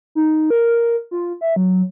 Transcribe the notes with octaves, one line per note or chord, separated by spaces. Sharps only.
D#4
A#4
F4
E5
F#3